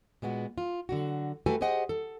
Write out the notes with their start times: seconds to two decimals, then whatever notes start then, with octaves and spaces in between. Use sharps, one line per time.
0.22 A#2 G#3 B3 F#4
0.58 F4
0.89 D3 F#3 F#4
1.46 A3 F#4 G4 A4 B4 G#5
1.61 G4 G#4 C5 D#5 F#5 G#5
1.89 A4